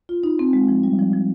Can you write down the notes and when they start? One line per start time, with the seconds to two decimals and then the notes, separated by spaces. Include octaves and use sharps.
0.09 F4
0.24 D#4
0.39 C4
0.53 G#3
0.69 F3
0.83 G3
0.99 F3
1.13 F3